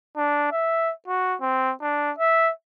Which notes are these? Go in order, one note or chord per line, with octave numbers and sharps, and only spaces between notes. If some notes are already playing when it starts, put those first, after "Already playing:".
D4
E5
F#4
C4
D4
E5